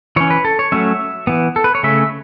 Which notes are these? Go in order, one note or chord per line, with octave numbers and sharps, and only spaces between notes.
E3 C#4 C#5
B4
A4
C#5
F#3 A3 C#4 E5
E3 B3
A4
B4
C#5
C#3 A3 C#4 E5